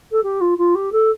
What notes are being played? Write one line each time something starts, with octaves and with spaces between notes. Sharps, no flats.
A4
G4
F4
F4
G4
A4